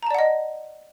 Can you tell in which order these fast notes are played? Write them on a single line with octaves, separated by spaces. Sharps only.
A#5 A5 D5 F#5 D#5